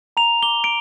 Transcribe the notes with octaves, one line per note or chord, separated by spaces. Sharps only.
A#5 F7
D6 G7
D7